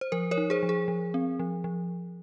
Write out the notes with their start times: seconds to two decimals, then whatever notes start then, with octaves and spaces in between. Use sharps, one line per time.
0.01 C5
0.12 F3 A#4
0.31 A#4 C#5
0.38 D#4
0.50 G#4 C5
0.63 F3
0.69 G#4
0.88 F3
1.14 C4
1.39 F3
1.64 F3